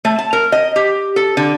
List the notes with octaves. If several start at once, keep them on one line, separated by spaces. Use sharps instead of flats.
A3
A5
A#4
D#5
G4
A4
D3